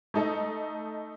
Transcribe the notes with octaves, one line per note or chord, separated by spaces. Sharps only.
A3 D#4 A4 D#5